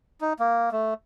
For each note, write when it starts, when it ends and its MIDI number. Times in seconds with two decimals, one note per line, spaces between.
0.21 0.33 63
0.39 0.70 58
0.72 0.94 57